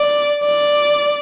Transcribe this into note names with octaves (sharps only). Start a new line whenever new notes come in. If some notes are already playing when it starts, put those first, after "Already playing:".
Already playing: D5
D5